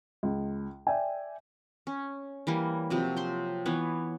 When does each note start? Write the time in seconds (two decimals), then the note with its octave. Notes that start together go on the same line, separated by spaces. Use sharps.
0.23 C#2
0.87 D5 E5 G5 G#5
1.87 C#4
2.47 E3 G3 A#3
2.90 C3 F3 F#3
3.17 C5 C6
3.66 E3 B3 C#5